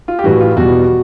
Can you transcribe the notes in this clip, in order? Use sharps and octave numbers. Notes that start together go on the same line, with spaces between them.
F4
G4
A2 E3 G3 F#4
F4
E2 B2 G3 F#4